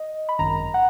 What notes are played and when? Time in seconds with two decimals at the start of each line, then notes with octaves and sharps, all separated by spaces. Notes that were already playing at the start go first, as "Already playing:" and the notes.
Already playing: D#5
0.29 B5
0.39 G#1 F#2 D#3 A#5
0.74 F#5